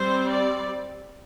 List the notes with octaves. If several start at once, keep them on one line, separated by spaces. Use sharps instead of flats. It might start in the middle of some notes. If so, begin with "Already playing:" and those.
Already playing: G3 C4 C5
D5